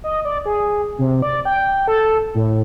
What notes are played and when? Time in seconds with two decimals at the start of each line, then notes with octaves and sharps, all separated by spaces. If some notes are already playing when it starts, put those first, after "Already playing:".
0.04 D#5
0.25 D5
0.46 G#4
0.99 C3
1.22 D5
1.45 G5
1.88 A4
2.35 A2